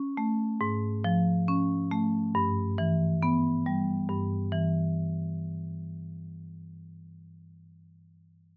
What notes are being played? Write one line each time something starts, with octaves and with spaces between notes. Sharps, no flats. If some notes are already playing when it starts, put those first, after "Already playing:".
Already playing: C#4
A3
G#2
F3
C#4
A3
G2
E3
B3
G3
G2
E3